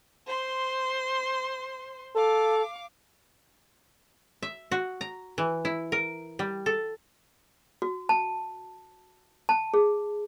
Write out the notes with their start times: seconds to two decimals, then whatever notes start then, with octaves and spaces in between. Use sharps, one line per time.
0.27 C5 C6
2.16 A4 F5 D6
4.43 E5
4.71 F#4
5.01 A#5
5.38 E3
5.65 E4
5.92 A#4
6.39 G3
6.66 A4
7.82 F#4
8.09 A5
9.49 A5
9.74 G#4